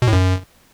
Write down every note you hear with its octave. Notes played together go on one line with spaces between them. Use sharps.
B2
A2
F#2